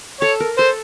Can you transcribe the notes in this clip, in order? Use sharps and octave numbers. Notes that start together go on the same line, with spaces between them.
A4 C#5
A#4
A4 C5